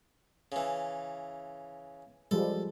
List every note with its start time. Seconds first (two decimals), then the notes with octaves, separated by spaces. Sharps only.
0.52 C#3 E3
2.31 F3 G3 G#3 A4